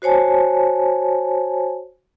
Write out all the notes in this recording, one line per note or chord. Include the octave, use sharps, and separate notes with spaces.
F#4 C5 C#5 G#5 A5